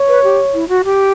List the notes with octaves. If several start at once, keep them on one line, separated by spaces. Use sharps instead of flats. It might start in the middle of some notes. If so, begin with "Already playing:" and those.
Already playing: C#5
B4
G4
E4
F#4
G4